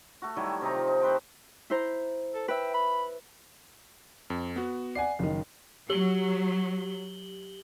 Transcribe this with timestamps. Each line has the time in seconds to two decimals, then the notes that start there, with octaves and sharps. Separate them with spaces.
0.22 A3 F#4
0.36 D#3 F#3 G3 E4
0.61 C3 D#4 A#5
0.74 F3
0.87 D#4
1.01 A3 B4 C5 G5
1.70 E4 C5 A#5
2.34 A4
2.48 B4 E5 G5
2.74 B5
4.30 F2
4.56 B3 F#4
4.95 D5 F#5 G#5 C7
5.19 F#1 D#3
5.90 F#3 G4 F#7 G7